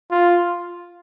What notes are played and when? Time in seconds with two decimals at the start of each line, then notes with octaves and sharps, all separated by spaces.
0.11 F4